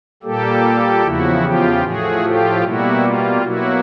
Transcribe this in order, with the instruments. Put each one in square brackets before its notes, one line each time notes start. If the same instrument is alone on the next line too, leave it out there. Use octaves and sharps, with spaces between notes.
[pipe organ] A#2 G3 A#3 G4 A4
E2 C#3 F3 E4 F#4
F4 G4
A2 F3 A3 F#4 G#4
F4 G4
B2 G3 A#3 E4 F#4
F4
B2 F#3 A#3 E4 F#4